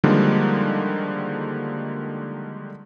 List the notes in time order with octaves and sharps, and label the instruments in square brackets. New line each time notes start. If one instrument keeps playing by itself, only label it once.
[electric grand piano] D3 D#3 F3 G3 G#3 A#3